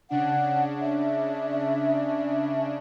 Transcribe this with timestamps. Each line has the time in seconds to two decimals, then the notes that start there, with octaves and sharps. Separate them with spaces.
0.10 C#3 D4 F#5
0.81 E5